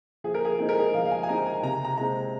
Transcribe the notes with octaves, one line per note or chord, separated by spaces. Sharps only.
F3 G#4
A#4
G#4
G#3 C4 D#4 G#4
A#4
G#4
F3 F5
F5
G#5
G#5
G#3 C4 D#4 A#5
G#5
C3 A#5
A#5
G#3 C4 A#5